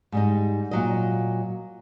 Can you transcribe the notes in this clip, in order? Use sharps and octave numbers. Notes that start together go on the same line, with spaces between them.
G#2 G3 D#4
A#2 F#3 D#5